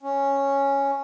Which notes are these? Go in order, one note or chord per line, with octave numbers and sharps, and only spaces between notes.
C#4